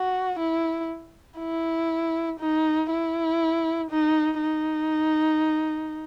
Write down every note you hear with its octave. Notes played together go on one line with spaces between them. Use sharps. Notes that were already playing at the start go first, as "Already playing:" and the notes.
Already playing: F#4
E4
E4
D#4
E4
D#4
D#4